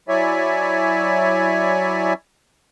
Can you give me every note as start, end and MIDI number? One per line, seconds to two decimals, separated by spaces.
0.08 2.13 54
0.08 2.13 64
0.08 2.13 73
0.08 2.13 74
0.08 2.13 76
0.08 2.13 80